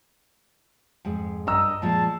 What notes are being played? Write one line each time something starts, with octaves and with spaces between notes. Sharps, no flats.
F2 G#2 G#3
G2 D#5 A#5 E6
A#2 F3 G#3 A5